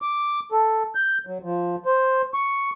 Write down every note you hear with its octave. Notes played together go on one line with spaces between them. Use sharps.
D6
A4
G6
F#3
F3
C5
C#6